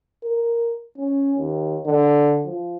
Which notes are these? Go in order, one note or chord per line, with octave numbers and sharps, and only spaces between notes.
A#4
C#4
D#2
D3
F3